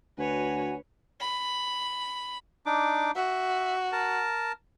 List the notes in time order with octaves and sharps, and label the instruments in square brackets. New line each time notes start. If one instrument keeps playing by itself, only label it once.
[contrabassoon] D2 [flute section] F#4 F#5 G#5 [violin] B4 C#5
[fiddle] B5
[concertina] D4 D#4 D6
[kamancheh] F#4 [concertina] E5
[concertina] A#4 A5